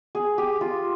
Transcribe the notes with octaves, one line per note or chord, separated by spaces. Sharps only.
G#4
G4
F4